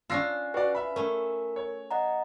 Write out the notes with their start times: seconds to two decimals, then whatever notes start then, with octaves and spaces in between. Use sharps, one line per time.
0.10 C#4 D4 F4 E6 A#6 C7
0.54 F#4 B4 D5
0.75 E5 B5
0.96 A3 C#4 A#4
1.56 C#5
1.91 D#5 F#5 A#5